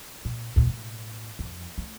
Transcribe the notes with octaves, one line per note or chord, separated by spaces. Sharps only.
A#2
D#2 A#2
A2
F2
A3